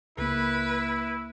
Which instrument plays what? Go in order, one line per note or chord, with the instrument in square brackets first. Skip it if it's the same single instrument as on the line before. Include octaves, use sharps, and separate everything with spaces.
[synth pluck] C#2 A#3 [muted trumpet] E4 [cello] B4